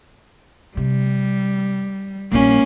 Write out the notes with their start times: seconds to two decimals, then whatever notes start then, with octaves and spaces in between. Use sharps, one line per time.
0.77 C3 G3
2.32 A#1 G3 A#3 C#4